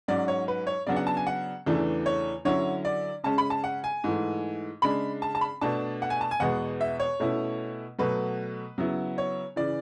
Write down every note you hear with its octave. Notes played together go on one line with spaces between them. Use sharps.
G#2 F#3 C#4 D5
C#5
B4
C#5
C#3 F#3 B3 D4 D5
F#5
A5
G#5
F#5
E2 C#3 E3 A3 D4
C#5
D3 F#3 C#4 E4 C#5
D5
C#3 G#3 C#4 A5
B5
A5
F#5
G#5
G#2 E3 A3
C#3 G#3 D4 B5
A5
A5
B5
B2 A3 D4 A5
F#5
G#5
A5
G#5
E2 B2 G#3 B3 F#5
E5
C#5
B2 A3 C#4 E4
B2 F#3 A3 B4
C#3 F#3 B3 E4
C#5
C#3 E3 D5